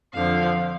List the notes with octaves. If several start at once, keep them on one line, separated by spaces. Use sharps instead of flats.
F2 D3 F3 F5